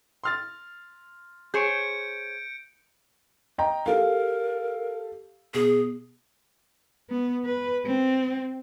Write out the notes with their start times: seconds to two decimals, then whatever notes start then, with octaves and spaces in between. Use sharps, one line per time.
0.24 C6 F6 A6
1.54 G#4 C5 C#5 G6 C#7 D7
3.58 D#5 G5 A#5
3.86 G4 A4 A#4 F5
5.54 B2 G#4
7.10 B3
7.46 B4
7.85 C4